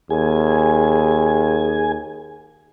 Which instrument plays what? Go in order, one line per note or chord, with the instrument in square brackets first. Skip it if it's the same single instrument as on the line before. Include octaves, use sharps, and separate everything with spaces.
[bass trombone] D#2 [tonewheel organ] G#4 G#5